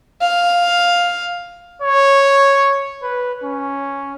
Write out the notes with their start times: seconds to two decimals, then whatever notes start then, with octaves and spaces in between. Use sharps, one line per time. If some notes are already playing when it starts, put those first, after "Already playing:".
0.22 F5
1.82 C#5
3.03 B4
3.44 C#4